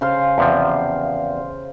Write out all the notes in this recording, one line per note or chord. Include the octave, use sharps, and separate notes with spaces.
C#3 C5 F5
E2 C3 F3